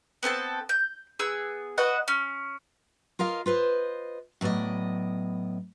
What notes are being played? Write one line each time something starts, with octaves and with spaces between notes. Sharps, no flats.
B3 C4 A4 A5
G6
B3 G#4 E6
F#4 B4 D#5 F#5
C#4
F4 A#4 D#5 F5
F4 B4 C5 D#5
A2 F#3 B3 D5 D#5